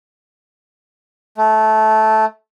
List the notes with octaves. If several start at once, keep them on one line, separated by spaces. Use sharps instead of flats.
A3